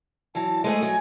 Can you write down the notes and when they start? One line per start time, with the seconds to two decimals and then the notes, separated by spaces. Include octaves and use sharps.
0.35 E3 F#3 A5
0.64 G#3 A3 G#4 C5
0.82 F#3 G#5